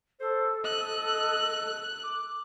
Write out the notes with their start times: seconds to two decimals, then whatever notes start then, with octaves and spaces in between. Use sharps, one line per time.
0.20 A4 C5
0.64 D#5 F#6
2.04 D6